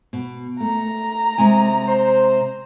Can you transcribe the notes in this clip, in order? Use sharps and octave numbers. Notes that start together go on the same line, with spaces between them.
B2
A3 A#5
C3 G#3 G#5
C5